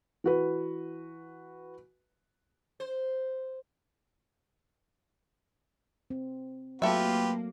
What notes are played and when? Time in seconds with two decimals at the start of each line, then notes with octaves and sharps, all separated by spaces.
0.24 E3 F#4 B4
2.80 C5
6.10 C4
6.82 F#3 A3 A#3 F4 G4 A4 B4 E5